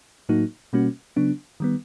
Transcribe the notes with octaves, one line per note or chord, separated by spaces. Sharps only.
A2 F#3 A#3 D#4 F#4
B2 G3 A#3 C#4 F#4
C#3 F#3 B3 D4
D#3 G3 B3